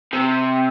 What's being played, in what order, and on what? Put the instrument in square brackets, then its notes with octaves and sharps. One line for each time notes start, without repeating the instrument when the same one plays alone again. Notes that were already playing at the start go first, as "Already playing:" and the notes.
[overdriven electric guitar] C3